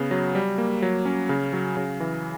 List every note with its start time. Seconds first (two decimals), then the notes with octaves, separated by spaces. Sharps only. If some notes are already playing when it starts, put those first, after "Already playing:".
Already playing: C#3 B3
0.11 F#3
0.35 G3
0.58 A#3
0.82 F#3
1.05 C#4
1.29 C#3
1.53 F#3
1.77 C#3
2.00 E3